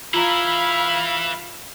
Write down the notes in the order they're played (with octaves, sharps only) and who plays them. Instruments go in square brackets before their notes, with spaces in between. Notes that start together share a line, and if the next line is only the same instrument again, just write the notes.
[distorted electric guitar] E3 E4 [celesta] F4 A#5 [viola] F5 B5